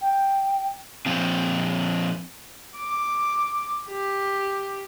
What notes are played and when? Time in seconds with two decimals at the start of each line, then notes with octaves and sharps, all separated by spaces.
0.02 G5
1.06 A#2 F3 C4
2.76 D6
3.88 G4